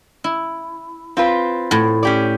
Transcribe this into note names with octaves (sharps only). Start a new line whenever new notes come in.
E4
C4 F4 B4
A2
C#4 G4 D5